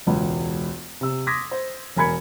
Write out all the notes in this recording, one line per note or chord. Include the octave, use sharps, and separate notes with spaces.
E1 C#2
C3 E6
C6 D6 D#6 G#6 A#6 B6
C5
E1 A#4 G#5 B5 G#6 C#7